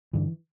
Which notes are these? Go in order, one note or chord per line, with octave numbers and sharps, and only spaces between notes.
G2 D3 E3